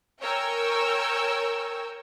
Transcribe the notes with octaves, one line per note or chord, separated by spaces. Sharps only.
A#4 C#5 G5 G#5 E6